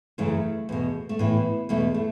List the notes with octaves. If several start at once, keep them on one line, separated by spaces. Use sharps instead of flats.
F#2 C#3 E3 A3
E2 B2
A3
A2 E3 B3
E2 B2 A3
A3